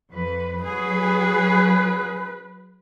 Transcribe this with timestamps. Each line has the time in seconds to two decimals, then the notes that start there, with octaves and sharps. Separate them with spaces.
0.11 F2 B4
0.63 F#3 G#4 B4